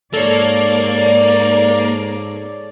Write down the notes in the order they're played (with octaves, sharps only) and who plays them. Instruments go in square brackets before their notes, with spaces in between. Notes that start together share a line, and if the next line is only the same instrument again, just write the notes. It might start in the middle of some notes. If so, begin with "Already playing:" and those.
[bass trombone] G#2 [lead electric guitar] A#3 [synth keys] A4 C#5 [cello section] D5